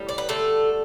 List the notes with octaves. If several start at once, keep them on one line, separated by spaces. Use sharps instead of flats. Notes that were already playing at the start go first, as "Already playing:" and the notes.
Already playing: A2 G3
D5
B4
D3 A3 A4